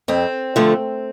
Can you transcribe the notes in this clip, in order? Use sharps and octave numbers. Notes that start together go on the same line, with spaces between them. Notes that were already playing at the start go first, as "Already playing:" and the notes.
F2 C4
D3 F3 A3